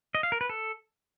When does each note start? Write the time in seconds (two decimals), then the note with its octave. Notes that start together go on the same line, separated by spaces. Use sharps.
0.15 D#5
0.23 F5
0.32 A#4
0.41 B4
0.49 A4